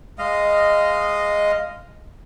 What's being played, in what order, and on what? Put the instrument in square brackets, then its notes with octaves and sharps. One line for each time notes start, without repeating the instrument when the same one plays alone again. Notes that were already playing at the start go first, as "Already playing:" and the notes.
[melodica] G#3 D#5 F5